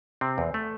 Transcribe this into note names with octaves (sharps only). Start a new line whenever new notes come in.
C3 C4
E2
A3